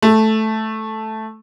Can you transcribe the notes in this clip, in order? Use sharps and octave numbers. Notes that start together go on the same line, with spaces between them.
A3